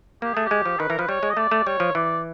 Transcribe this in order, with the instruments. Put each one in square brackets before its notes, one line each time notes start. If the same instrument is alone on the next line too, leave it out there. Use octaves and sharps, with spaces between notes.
[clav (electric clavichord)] A#3 [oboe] G4
[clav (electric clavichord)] A3 [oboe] G#4
[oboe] G4
[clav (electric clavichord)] G#3
F3
[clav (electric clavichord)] D#3 [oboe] B4
[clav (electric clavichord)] E3 [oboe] A#4
[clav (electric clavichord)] F3 [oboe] B4
[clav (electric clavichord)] G3 [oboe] C#5
[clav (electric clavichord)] G#3
[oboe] D#5
[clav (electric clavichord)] A3 [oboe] D5
[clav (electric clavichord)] A3
[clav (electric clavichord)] G3 [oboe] C#5
[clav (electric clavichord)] F3
[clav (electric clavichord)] E3 [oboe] D5